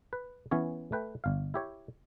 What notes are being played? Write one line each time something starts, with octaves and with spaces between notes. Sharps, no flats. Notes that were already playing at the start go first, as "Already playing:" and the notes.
B4
E3 B3 C#4 C#5
A3 B4 G5
G1 F5
E4 G4 C#5